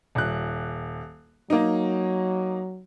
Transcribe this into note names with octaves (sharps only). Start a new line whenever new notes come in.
D#1 F#6
F#3 A#3 D#4